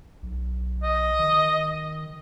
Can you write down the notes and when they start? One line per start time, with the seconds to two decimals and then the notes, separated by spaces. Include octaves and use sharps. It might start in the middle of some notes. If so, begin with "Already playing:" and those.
0.22 B1
0.83 D#5
1.19 D#3